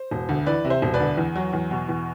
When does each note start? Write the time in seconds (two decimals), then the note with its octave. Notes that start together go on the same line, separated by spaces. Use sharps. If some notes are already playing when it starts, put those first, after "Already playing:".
Already playing: C5
0.11 E1
0.29 D2
0.46 E3 B4 D5
0.65 C3
0.70 C5 E5
0.82 E1
0.94 B4 D5
1.00 D2
1.18 E2
1.35 F#3
1.53 E2
1.71 B2
1.89 E2